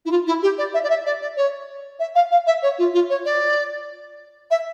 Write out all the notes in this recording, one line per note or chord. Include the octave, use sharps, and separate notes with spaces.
E4
F4
E4
G4
D5
E5
D5
E5
D5
D5
C#5
E5
F5
F5
E5
C#5
F4
F4
C#5
D5
E5